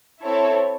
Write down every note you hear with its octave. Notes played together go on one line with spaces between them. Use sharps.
C4 E4 A4 C#5